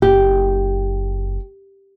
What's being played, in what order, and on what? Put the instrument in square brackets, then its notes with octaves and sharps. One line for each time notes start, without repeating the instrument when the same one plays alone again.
[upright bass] F#1 [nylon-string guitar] G4